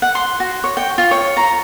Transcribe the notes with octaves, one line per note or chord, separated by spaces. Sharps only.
F#5
C6
F#4
C#5
G5
F4
C#5
A#5